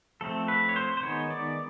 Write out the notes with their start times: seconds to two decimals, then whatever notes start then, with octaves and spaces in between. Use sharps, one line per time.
0.21 F3 A3 C4 A4
0.48 B4
0.69 C#5
0.76 C5
0.97 C5
1.03 D#3 G#3 B3 C#5
1.31 D5